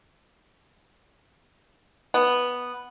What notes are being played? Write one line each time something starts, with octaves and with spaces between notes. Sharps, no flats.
B3